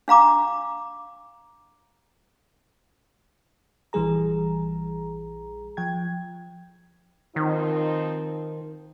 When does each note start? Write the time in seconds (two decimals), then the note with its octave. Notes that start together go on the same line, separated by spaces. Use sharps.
0.08 D4 F5 A#5 D6
3.93 A#1 E3 G3 G#4 A#5
5.77 F3 G5 G#6
7.36 D#3 F3 C4 D#4